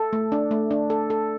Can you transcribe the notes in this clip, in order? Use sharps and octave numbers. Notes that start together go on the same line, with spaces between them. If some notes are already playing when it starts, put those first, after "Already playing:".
Already playing: A4
A3
D4
A3
D4
A4
A4